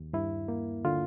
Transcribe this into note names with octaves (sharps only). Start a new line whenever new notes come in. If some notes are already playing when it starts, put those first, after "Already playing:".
Already playing: D#2
G2 E4
A#3
D3 F4